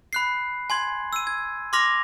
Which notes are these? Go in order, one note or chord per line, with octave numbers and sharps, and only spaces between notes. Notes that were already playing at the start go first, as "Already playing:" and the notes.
B5 F#6 C7
G#5 C6 G#6
E6 D#7
G#6
C6 D6 F6 A#6 F7